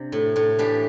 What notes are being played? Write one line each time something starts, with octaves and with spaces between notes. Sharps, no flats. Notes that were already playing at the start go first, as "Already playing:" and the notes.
Already playing: C3 D4
A2
A2
E3 D4 G4